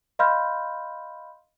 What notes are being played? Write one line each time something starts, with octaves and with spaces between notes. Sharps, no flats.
D#5 F5 B5 C6 F6 G6